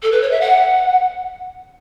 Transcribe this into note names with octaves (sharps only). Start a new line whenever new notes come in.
A4
B4
C#5
E5
F#5